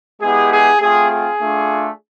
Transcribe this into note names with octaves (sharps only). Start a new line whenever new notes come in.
G#3 B3 E4 G4 G#4
G#4
A3 C4 F4 G#4
G#4
A3 D4 F4